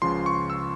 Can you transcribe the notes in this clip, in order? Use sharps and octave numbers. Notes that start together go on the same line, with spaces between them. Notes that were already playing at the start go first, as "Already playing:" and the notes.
C#2 C#3 F3 C6
C#6
E6